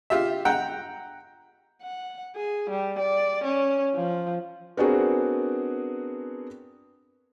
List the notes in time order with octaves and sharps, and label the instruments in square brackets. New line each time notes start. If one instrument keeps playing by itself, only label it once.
[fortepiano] F4 G4 E5
F#5 G5 A#5
[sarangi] F#5
G#4
G3
D5
C#4
F3
[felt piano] B3 C4 D4 F#4 G#4 A#4